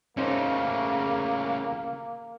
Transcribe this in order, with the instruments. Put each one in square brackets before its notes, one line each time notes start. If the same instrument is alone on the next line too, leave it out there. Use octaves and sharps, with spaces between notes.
[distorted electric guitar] C#3 A3 [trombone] A#3 [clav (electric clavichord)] C#4 D#4 C5